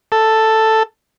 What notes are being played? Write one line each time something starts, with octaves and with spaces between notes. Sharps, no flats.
A4